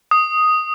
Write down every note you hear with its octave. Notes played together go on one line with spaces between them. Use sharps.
D#6